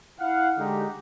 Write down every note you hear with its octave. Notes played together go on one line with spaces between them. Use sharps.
E4 F5 F#5
D3 G#3 D#4 G4